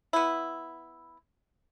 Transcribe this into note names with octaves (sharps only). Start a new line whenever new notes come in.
B3 E4